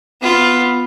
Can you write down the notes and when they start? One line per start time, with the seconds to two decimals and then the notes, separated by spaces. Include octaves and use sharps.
0.21 B3 F4